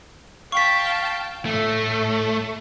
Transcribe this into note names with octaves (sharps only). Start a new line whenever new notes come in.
F5 G5 A5 C#6 B6
A2 A3